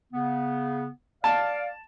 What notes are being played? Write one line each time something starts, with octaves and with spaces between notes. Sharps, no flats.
C#3 B3
D5 F5 A5